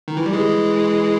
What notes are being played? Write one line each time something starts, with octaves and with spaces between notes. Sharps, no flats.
D#3
E3
G3
E3 G#3